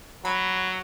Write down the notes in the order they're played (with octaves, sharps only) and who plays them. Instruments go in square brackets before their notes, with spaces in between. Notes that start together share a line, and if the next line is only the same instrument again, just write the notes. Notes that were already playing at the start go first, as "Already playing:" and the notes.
[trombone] F#3 [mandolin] B5